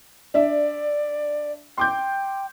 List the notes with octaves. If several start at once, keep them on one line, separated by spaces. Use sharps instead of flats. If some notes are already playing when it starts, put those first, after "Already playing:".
D4 D5 E5
G5 C6 D6 G6